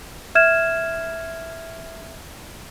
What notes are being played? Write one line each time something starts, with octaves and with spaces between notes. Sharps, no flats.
E5 F6 G#6 E7